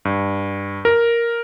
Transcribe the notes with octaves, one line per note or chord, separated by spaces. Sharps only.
G2
A#4